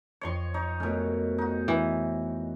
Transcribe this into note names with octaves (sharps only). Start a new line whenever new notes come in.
F2 C#5 D#5 C6 C#6
D#4 C#5
B2 A3 A#3 C#4
D#4 F#4
E3